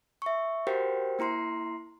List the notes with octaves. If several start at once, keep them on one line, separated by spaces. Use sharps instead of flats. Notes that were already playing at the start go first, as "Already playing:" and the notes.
E5 C#6
F#4 G4 A#4 C5 F5 G5
A#3 E4 A#5 C6 C7